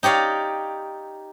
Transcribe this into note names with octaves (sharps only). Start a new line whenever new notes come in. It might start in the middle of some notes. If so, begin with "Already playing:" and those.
D#4 G4 C#5 D5 F5